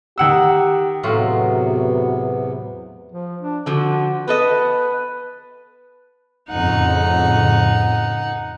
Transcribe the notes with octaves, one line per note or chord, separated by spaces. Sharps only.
D#3 G4 F#5 E6
E2 A2 C3 F#3 B3 F4 F#4
F3
D4
D3 F3 F#4
B3 A4 B4 D#5
F2 A2 C#3 D#4 F#5